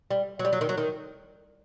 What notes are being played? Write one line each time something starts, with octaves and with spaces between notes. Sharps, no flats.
G3
F#3
G3
F#3
D#3
F#3
D#3